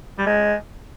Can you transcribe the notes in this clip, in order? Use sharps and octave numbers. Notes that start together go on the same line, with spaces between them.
G3
G#3